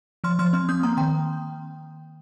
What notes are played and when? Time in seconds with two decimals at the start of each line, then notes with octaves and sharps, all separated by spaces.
0.24 F3 C6 F6
0.39 F3 C6 F6
0.53 C4 C6 F6
0.69 C4 D#6 G6
0.83 A#3 A#5 D#6
0.97 D#3 G5 C6